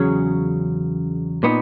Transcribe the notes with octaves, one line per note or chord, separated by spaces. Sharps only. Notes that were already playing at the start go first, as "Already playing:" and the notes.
Already playing: E2 C#3 F#3 C#4 G#4
A#2 G#3 B3 D#4